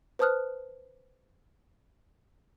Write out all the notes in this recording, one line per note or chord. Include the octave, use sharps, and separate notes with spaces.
B4 C5 A5 D#6 F6 F#6